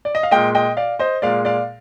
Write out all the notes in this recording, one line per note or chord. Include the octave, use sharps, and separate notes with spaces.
D5
D#5
F5
A#2 G#3 D#5 G5
D#5 G5
D5 F5
C5 D#5
A#2 G#3 D5 F5
D5 F5